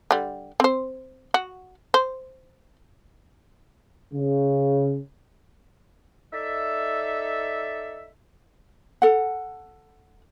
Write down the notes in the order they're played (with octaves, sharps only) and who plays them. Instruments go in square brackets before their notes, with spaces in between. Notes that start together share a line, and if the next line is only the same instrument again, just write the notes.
[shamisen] D3 G3
C4 C5
F#4
C5
[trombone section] C#3
[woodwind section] D#4 A4 D5 E5
[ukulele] A4 F#5